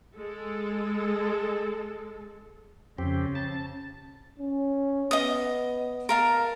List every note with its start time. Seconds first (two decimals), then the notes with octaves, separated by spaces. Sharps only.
0.16 G#3 A4
2.99 F2 C#3 C4 G4
3.35 A5
4.39 C#4
5.11 B3 D#5 D#6
6.09 A#4 F5 A5